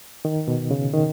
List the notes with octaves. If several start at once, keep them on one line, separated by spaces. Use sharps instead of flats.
D#3
B2
C#3
D#3